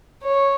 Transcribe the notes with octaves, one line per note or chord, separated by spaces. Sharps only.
C#5